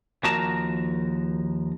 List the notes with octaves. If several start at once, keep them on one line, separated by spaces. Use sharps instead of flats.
D#2 F3 F#4 A#4 A5 A#5